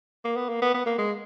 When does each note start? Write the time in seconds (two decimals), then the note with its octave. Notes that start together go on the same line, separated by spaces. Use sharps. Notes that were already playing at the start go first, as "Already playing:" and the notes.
0.25 A#3
0.37 B3
0.49 A#3
0.62 B3
0.75 B3
0.86 A#3
0.98 G#3